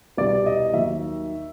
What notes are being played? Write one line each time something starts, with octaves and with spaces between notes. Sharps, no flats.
C2 B2 G3 D5
D#5
D#2 D#3 F#3 E5